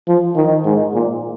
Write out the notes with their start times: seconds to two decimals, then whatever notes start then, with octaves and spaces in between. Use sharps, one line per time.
0.08 F3
0.36 D#3
0.65 G#2
0.93 A#2